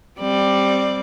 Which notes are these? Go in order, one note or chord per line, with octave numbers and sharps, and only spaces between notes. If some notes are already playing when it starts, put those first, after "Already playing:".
G3 C4 D5